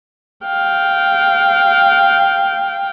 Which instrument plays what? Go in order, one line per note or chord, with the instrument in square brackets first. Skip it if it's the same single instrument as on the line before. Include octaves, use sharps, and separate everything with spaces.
[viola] F5 G5